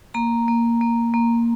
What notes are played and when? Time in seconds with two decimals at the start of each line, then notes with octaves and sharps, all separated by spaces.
0.14 A#3 A#5
0.48 A#3
0.81 A#3
1.14 A#3